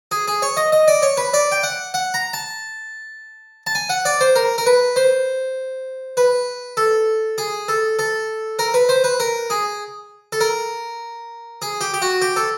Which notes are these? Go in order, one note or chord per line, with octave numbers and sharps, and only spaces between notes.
G#4
G#4
C#5
D#5
D#5
D5
C#5
B4
D5
G5
F#5
F#5
A#5
A5
A5
G#5
F#5
D5
C5
A#4
A#4
B4
C5
B4
A4
G#4
A4
A4
A#4
B4
C5
B4
A#4
G#4
A4
A#4
G#4
G4
G4
F#4
G4
A4